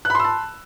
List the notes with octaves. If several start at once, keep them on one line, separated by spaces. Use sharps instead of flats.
A5 B5 C6 E6 F#6